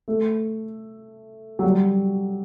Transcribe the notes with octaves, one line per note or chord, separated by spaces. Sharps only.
A3
F#3
G3